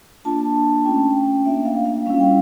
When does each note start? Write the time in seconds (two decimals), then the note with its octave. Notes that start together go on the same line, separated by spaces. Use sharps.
0.25 A#3 D4 F4 A5
0.85 A3 C#4 F4 G5
1.45 A#3 D4 F4 E5
1.65 F5
1.85 F5
2.06 G3 C#4 E4 F5
2.20 G5